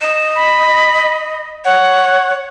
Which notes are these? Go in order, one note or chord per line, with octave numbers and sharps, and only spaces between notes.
D#5 E7
B5
C#5 F#5